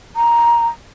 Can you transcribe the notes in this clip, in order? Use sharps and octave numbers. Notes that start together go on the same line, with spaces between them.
A#5